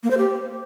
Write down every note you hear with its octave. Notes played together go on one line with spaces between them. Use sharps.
A#3
C5
G4